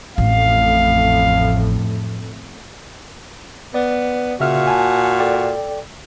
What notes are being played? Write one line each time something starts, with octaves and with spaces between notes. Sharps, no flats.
A1 F2 A2 F5
B3 D5
A#2 C#3 F#4 E5 F6
G#5 A5
A4 D5 G5